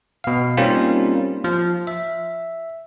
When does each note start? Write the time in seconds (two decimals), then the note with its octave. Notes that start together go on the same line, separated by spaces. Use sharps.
0.24 B2 F5
0.57 G3 A#3 C4 C#4 D#4 F4
1.44 F3
1.87 E5